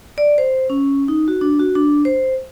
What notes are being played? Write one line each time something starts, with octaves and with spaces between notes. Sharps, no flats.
D5
C5
C#4
D#4
F#4
D4
F#4
D4
C5